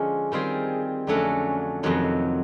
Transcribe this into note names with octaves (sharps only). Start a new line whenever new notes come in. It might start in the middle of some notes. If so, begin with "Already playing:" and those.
Already playing: D3 F3 G#3 C#4 F4
D#3 G3 C4 F4 G#4
F2 D3 F#3 A3 C#4
F2 C3 D#3 F#3